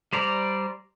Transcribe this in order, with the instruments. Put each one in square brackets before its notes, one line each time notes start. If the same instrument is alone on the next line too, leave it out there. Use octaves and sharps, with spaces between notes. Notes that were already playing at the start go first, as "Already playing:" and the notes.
[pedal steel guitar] G3 C5 D5 A#5